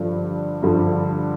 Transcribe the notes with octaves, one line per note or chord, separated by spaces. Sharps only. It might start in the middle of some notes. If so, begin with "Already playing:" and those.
Already playing: G2 D3 F3
G2 D3 F3